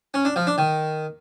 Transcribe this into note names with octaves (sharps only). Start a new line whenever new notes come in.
C#4
D4
F3
D4
D#3